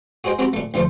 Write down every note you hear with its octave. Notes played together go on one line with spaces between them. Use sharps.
F#4 G#4 C5 D#5 G5
C4 F#4 G4 G5 A#5 B5
A#2 A3
D2 A#2 F3 A3 C5